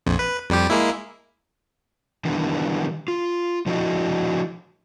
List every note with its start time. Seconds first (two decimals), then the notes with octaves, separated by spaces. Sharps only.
0.06 A#1 F2
0.19 B4
0.50 F2 G3 G4
0.70 G#3 A#3 E4
2.25 D#3 E3 G3 B3 D4
3.08 F4
3.66 F3 D4 E4 F#4 D#5